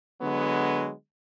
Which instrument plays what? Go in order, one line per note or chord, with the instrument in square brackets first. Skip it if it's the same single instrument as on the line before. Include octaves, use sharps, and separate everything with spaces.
[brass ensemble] D3 F#3 G#3 B3